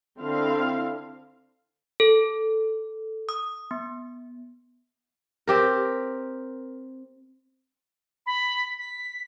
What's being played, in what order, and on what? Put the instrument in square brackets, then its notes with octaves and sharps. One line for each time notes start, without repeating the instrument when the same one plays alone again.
[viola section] D3 C4 E4 F5
[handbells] A4
D#6
B3
[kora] C4 G4 A#4
[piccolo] B5
B6